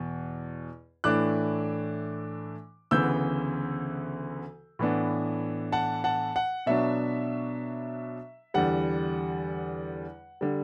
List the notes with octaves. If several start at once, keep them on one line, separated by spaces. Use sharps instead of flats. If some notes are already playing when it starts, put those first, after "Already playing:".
Already playing: E2 B2
A2 E3 A3 D4 D6 F#6
D2 C#3 E3 B3 E6 G6
A2 E3 B3 D4
F#5 A5
F#5 A5
F#5
B2 F#3 B3 D4 E5
E2 D3 G3 F#5
D3 G3